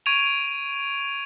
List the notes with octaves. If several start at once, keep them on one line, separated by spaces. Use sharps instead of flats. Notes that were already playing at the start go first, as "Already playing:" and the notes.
C#6 G#6 D7 D#7 F7